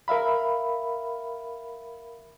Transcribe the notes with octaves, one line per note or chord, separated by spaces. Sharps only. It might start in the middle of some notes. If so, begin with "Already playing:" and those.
A#4 E5 F5 B5